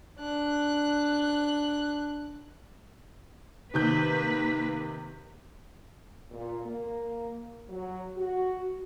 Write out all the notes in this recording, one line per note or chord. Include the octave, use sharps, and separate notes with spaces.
D4 F#6
C3 D#3 A#3 B4 G6
A#2
A#3
F#3
F#4